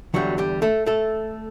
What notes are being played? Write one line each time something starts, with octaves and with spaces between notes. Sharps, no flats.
E2 D3 F#3 G3 F#4
G3 G4
A3 A4
A3 A4